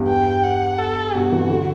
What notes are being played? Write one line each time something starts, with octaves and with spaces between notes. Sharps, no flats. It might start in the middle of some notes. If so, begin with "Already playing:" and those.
Already playing: E2 G2
G5
F#5
A4
G2 B2 F#4
C3 E3
D3 F#3